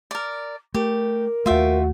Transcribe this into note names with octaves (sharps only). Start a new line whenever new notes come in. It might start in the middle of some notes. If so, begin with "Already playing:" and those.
A#4 D5
A3 G4 A#4
D#2 A3 F4 F#4 E5 G5